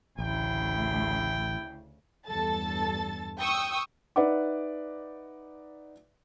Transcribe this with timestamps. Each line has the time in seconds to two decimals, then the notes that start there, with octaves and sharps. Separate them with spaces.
0.19 A1 D2 C#3 E4 G5
2.26 E2 G2 A4 A5 A6
3.38 G5 C#6 D#6 E6
4.16 D#4 B4 D5 E5 F#5 D6